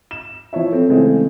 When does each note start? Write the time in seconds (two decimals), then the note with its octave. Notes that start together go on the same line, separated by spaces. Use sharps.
0.11 E7
0.53 F3 E4 C#5 E5
0.72 C4 A4
0.89 C#3 E3 G#3 A3 C4